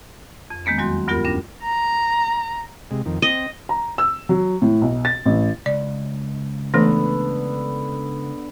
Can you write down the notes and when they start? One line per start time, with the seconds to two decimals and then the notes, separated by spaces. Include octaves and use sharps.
0.50 F2
0.65 D#3 G#3 A#3 B3 C#4
0.78 E2 F#3 G3 F#4 C6
1.08 D2 G2 B3 F4 G4 A#4
1.24 D#2 C#4 D4 A#6
1.62 A#5
2.91 C3 G#3
3.06 F2 D#3
3.22 C4 D#5
3.69 A#5
3.98 E6
4.29 F#3
4.62 A2
4.82 B1
5.05 A6
5.26 A1
5.66 C#2 D5
6.74 D3 E3 A3 B3